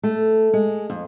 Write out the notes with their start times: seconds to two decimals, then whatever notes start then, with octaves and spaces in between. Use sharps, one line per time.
0.03 A3
0.53 G#3
0.90 F2